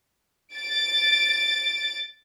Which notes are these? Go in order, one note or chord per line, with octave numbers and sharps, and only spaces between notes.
A6 D7